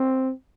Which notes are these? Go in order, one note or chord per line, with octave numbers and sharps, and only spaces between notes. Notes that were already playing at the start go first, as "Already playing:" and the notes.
Already playing: C4